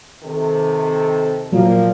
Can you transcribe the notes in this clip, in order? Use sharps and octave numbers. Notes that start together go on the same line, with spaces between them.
C3 D#3 A4
A#2 F3 F#3 A#3